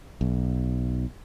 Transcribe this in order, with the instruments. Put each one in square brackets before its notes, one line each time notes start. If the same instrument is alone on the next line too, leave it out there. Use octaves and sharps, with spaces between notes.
[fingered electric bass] B1